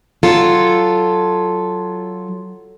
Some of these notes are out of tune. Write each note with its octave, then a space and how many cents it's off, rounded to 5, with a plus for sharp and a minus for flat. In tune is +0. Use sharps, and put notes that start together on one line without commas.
F#3 +5 F4 +0 A4 +0